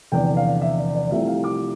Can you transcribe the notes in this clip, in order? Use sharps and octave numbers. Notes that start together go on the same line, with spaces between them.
F1 E2 D3 G5
F5
E5
D5
D5
C2 C3 F3 A3 E5
F5
D6